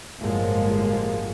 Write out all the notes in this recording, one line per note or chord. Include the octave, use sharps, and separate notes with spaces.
G1 A2 F3 F#3 G#3 A#3